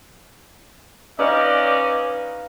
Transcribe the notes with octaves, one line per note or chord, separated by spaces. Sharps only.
C#4 D#4 B4 D5 D#5 F5